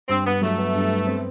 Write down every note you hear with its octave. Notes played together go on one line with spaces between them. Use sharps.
G2 C4
G2 B3
F#3 A3
B3
G2
B3
C4